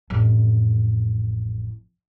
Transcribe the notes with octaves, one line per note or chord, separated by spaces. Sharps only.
A1 F2